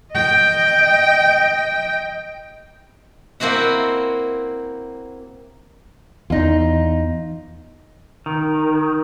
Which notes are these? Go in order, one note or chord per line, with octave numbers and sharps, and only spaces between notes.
D#5 G5
A#3 C4 E4 F#4 F#5
E2 D#4 F4
D#3